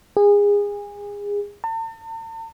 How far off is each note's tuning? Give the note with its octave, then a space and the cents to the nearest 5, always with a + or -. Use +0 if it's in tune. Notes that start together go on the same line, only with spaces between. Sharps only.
G#4 -25
A5 +45